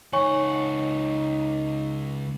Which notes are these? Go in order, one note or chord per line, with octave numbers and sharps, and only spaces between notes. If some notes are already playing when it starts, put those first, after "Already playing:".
C#2 D#4 C#5 F#5 G#5 C#6